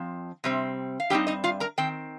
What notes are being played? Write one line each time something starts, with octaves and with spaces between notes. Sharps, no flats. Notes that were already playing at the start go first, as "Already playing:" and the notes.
Already playing: F2 F3 C4
C3 G3 C4
F5
G2 G3 C4 D#4 G4 G5
D#4 D#5
F4 F5
A#4 A#5
D#3 C4 G5